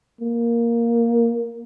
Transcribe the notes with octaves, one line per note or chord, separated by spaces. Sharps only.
A#3